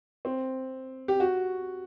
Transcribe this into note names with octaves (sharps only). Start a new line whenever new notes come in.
C4
G4
F#4